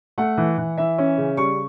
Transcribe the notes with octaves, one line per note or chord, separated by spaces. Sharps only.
A3 F#5
E3
E3
E3 E5
C#4
C#3
G3 C#6